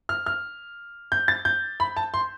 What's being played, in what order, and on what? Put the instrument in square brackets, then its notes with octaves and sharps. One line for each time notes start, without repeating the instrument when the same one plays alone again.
[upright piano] F6
F6
G6
A6
G6
B5
A5
C6